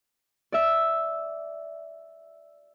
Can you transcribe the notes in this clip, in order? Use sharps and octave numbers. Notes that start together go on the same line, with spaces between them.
D5 E5